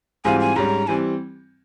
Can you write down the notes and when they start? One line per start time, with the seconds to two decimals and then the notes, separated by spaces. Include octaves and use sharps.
0.25 G#2 E3 G3 C4 F4 G#5
0.40 G#5
0.56 G#2 G3 C#4 A#5
0.87 E3 G3 C4 G#5